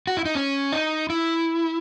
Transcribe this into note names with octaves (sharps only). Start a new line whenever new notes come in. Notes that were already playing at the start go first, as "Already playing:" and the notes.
F#4
E4
D#4
C#4
D#4
E4